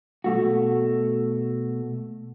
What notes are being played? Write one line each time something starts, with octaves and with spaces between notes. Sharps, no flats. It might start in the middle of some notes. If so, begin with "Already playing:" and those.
B2 A3 F#4